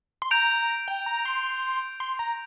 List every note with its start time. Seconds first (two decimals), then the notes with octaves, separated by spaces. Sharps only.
0.22 C6
0.31 A#5 G6 D7 F7
0.88 G5
1.06 A#5
1.25 C6
2.00 C6
2.19 A#5